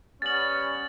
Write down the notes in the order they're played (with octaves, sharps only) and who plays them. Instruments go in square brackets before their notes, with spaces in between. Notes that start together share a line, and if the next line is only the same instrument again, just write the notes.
[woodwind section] G3 B3 C#4 [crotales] A6 F#7